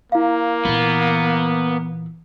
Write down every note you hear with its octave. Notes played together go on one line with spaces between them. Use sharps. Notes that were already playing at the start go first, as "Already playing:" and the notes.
A#3 E4 F5
A#2 E3 B3